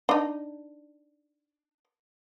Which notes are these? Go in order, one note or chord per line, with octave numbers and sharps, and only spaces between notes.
D4 D#4